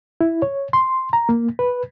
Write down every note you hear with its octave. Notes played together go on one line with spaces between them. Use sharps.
E4
C#5
C6
A#5
A#3
B4